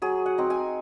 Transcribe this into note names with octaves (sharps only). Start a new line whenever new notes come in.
F#3 G#4
F#5
C4 D#4
G#5